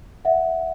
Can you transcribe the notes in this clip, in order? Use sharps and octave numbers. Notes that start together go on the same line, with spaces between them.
E5 F#5